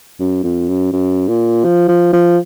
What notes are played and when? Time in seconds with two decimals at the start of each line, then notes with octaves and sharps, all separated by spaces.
0.20 F#2
0.44 F2
0.68 F#2
0.93 F#2
1.28 A#2
1.64 F3
1.88 F3
2.13 F3